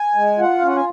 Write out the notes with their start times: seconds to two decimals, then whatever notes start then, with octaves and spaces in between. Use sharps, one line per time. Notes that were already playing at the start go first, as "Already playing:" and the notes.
Already playing: G#5
0.15 G#3
0.38 F4 F#5
0.58 C#4 F5
0.67 F#5
0.76 G#5